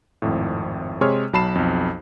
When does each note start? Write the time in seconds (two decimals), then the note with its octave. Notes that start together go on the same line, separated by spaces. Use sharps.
0.22 G#1 F2 A2
1.01 C3 G#3 G#4 C#5 C6 F6
1.33 B1 F#3 A5 B5 C7 E7
1.55 B1 F2